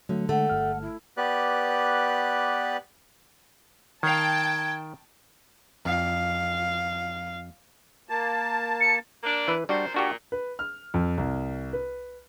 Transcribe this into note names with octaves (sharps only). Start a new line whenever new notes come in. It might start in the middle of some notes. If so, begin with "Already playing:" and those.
D3 F#3 A3
D3 G#3 A3 F#5
G1 F6
E4
B3 G4 B4 D5 F#6
D#3 F5 G5 A5 G#6
F2 F5
A#3 A5
C#7
A#3 D4
E3 B4
A#2 G3 D4 F#4 C5
A#2 D4 F#4 G4
B4
F6
F2
C2
B4